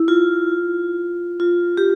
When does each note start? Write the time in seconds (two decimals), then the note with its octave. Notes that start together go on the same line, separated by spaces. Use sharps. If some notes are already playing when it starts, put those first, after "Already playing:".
Already playing: E4
0.08 F4
1.40 F4
1.77 G4